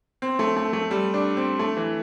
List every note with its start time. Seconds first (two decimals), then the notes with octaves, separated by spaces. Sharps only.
0.22 C4
0.39 A3
0.56 A3
0.73 A3
0.91 G3
1.14 D4
1.37 C4
1.59 A3
1.77 E3